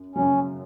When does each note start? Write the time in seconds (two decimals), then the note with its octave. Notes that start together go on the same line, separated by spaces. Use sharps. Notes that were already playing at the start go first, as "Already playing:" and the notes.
Already playing: F#2
0.15 F#2 C#3 F#3 C#4